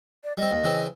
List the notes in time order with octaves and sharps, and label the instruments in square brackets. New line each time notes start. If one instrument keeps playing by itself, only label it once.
[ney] D5
[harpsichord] G3 C4 [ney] D#5
[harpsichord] D#2
C#3 E3 C4